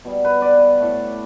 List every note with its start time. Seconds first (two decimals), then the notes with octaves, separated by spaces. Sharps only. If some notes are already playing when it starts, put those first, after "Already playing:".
0.05 B2 G3
0.25 B4
0.42 D5
0.80 A2 A3